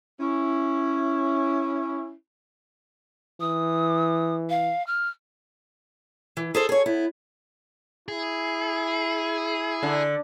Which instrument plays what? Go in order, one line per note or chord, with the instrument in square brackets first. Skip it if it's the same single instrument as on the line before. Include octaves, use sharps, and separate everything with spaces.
[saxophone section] C#4 E4
[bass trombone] E3 [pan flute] D#6
[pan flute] F5
F6
[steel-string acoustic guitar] E3
G#4 A4 C5
G#4 C#5
B3 E4
[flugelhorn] E4 [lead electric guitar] G#4
[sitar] D3